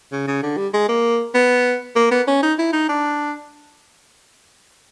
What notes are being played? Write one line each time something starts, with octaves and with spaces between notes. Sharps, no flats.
C#3
C#3
D3
G3
G#3
A#3
B3
A#3
B3
C#4
D#4
E4
D#4
D4